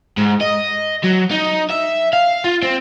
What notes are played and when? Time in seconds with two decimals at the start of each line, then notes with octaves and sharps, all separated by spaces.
0.18 G#2
0.41 D#5
1.04 F#3
1.31 D#4
1.70 E5
2.13 F5
2.44 F4
2.63 C4